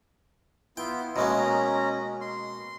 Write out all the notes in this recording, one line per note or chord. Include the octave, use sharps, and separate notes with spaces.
B3 E4 F4 G5
B2 G#3 A#3 C#4 A#5
C6